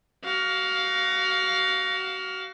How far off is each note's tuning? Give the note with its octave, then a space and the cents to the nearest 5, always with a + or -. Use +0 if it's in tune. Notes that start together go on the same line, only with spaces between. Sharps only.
F#4 +30 F5 +10